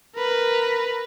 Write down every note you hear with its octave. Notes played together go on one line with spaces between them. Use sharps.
A#4 B4